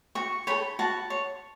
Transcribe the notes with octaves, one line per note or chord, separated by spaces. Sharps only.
F#4 C#6
A4 C#5 B5
F#4 A5
C#5